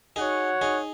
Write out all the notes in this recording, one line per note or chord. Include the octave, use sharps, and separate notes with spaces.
D#4 F#4 G#4 C#5 F#5
D#4 G#4